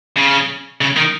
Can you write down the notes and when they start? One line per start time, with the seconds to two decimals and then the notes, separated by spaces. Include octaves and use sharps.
0.16 C#3
0.81 C#3
0.97 D#3